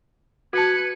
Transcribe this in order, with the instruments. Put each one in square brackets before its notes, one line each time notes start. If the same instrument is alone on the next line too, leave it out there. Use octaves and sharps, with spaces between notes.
[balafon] F#4 A5 [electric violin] B4 C#7 [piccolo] G#6